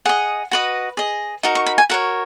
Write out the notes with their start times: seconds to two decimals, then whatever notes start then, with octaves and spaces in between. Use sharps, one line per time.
0.05 G#4 D#5 F#5
0.51 F#4 B4 D#5
0.97 G#4 D#5
1.43 D#4 F#4 A#4
1.55 C#6
1.66 B5
1.78 G#5
1.90 F#4 A#4 C#5 F#5